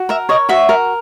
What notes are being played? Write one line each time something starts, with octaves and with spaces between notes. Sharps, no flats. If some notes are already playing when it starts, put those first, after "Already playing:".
Already playing: F#4
A#4 E5
C#5 D#5
F#4 E5
A#4